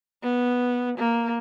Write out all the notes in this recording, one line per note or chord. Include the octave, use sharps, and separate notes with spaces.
B3
A#3